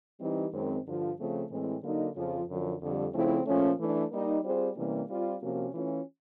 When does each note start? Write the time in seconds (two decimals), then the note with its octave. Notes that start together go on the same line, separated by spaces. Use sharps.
0.19 E3 G3 C4 D#4 G4
0.51 F#2 D#3 G#3 C4
0.84 G2 D3 F3
1.17 C#3 F3 A3 C4 F4
1.49 A2 E3 G#3 C4
1.82 D3 F#3 A#3 D#4
2.15 F2 C#3 F3
2.47 F#2 D3 F3
2.80 F2 D3 G3
3.13 C#3 F3 A3 C4 E4
3.45 A#2 F3 A3 C#4
3.78 E3 A3 D4
4.11 G3 A#3 D#4
4.43 G3 C4 F4 G#4 C5
4.75 C3 E3 G3 A#3 C#4
5.08 G3 C4 F4
5.41 C3 F3 A#3 C#4 F#4
5.73 E3 A3 C#4 F4